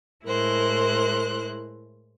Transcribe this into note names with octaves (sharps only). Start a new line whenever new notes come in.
A2 G#3 E4 A#4 C5 F#6